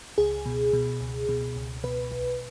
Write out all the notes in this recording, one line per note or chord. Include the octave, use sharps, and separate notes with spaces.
C#2 G#4
B2
B2
C#2
B2
C#2
B2 B4
B1